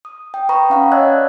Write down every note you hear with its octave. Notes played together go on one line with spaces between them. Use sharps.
D#6
G5
B4 G5 A#5 B5 C#6 D#6
C#4 F5 F#5
C#5 D#5 A5 E6 F#6 G#6
D5